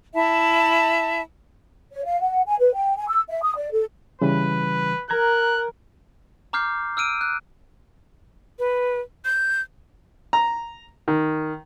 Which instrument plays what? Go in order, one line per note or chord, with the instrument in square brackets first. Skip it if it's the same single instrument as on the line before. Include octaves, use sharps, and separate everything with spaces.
[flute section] E4 E5 A5
C#5
F5
F#5
G#5
B4
G5
G#5
E6
E5
D#6
D5
A4
[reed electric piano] C#3 E3 G3 [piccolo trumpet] B4
[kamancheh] A#4 [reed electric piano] A#5 G#6 [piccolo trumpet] F#6
[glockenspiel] A#5 D6 F6 G6 C7
E6 F6 D7 D#7
F#6
[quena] B4
G6
[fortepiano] A#5
D#3